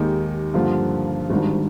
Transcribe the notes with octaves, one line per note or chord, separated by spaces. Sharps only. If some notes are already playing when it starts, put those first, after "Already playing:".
Already playing: D#2 D#3 G#3 D#4 G4
G2 D3 F3 A#3 F4
G#1 G#2 D#3 G3 D4